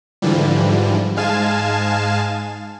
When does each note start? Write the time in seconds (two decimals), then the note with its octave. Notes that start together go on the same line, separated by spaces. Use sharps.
0.22 G#2 D3 E3 F3 G3
1.16 G#2 G#3 F5 G#5 A5 E7